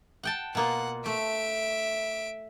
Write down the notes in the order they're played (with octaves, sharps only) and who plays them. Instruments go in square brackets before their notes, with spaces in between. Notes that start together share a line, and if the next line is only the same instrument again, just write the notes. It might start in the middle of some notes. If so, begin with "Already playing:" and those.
[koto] F#5 G5 A5
[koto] B2 A#3 F4 [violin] F#5
[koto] A3 [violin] E5 D7